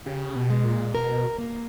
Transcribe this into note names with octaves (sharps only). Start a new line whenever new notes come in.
C#3 G4
B2
G#3
A#2
B2 A#4
A#3